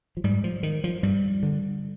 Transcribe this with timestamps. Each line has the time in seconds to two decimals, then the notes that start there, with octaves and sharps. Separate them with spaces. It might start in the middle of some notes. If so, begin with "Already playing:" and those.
0.17 F3
0.24 G#2 G3
0.44 F3
0.63 D#3
0.84 F3
1.03 G2 G3
1.43 D3